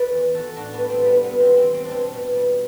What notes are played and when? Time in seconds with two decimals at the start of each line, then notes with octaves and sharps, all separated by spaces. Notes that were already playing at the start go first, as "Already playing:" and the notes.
Already playing: B4 D5
0.11 E2
0.34 E2 F#4 A4
0.56 A2 D4 F#4
0.73 B3 D4
0.79 G3
0.90 C4
1.01 G3
1.07 B3
1.23 C3 B3
1.40 C4
1.46 E2
1.57 C4
1.68 E2
1.74 C4
1.85 D4
1.91 B2 C4
2.13 B2
2.35 G3